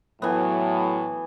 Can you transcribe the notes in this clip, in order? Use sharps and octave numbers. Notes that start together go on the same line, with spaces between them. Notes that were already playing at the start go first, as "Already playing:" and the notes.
A2 E3 F#3 B3